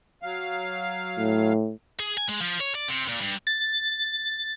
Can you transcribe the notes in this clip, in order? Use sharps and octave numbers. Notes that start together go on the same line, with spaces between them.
F#3 F5
A2
G#4
G#5
G#3
F3
C#5
D5
C3
A#2
G2
A6